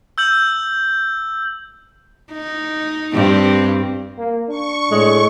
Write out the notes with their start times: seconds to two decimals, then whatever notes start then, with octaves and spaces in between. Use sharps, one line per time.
0.18 E6 G6 F#7
2.32 D#4
3.14 G2 C4
4.18 A#3
4.49 D4 C#6
4.91 A2 G#3